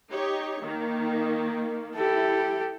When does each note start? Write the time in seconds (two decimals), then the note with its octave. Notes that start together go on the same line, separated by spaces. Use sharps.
0.11 D#4 G4 C#5
0.62 D#3 A#3
1.96 E4 G4 A4